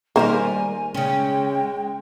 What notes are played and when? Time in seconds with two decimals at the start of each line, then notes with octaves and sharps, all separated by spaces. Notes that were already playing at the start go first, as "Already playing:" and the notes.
0.16 D#3 G3 A#3 A#4 C5 G#5
0.94 C#3 G#3 C#4 G5